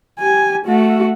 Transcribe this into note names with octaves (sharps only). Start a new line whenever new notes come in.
G4 G#5
A3 F#4